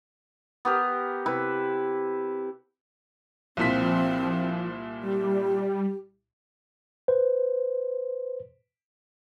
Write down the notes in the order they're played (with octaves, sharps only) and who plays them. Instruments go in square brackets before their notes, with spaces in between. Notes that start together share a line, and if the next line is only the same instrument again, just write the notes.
[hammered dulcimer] B3 G4 A#4
C3 E4 B4
[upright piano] C2 A#2 B6 [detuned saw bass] F3 [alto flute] C4
[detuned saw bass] G3 [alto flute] G4
[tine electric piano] B4 C5